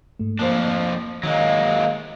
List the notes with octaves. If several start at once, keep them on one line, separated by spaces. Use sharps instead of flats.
G#2 A3
F2 F3 A#3 D4 C5
D#3 F#3 G#3 A#3